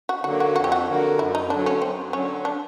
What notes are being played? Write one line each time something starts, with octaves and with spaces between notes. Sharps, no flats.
F#4
D3 F#3 A#3 F#4
F#4
F2 F#4
G4
F#4
D3 F#3 A#3
F#2 E4
D#4
D3 F#3 D4
C#4
F#2 C4
D3 F#3 C#4
D4